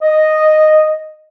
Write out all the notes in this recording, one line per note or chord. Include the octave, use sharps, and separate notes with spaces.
D#5